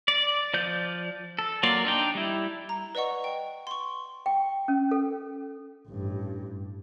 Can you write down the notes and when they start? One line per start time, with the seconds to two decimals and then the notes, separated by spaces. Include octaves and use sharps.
0.08 D5
0.54 F3 D5 G6
1.39 A4
1.63 F#3 A#3 F4 D5
1.85 D4 D#4 G5
2.15 G3 E4
2.69 A#5
2.95 B4 D5 D#5 F#5 C#6
3.24 G5
3.67 C6 C#6
4.26 G5
4.68 C#4
4.91 A4
5.88 A1 G2